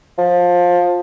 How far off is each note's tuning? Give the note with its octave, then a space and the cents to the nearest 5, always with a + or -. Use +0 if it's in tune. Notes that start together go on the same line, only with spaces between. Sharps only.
F3 +20